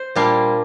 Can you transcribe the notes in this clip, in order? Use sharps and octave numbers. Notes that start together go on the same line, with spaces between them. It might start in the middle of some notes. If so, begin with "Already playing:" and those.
Already playing: C5
A#2 G3 A#3 D4 F4